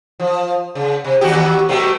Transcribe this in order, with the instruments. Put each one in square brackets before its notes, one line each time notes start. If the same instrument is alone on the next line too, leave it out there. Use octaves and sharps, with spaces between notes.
[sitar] F3
C#3
C3
D#2 F#4 G4
B2 G3 A3